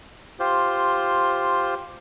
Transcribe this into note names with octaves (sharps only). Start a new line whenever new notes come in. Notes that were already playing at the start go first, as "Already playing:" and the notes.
F4 G4 C5